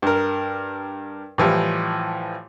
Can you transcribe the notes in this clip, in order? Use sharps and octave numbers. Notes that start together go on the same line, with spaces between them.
G2 A#4
A2 E3 F3 G3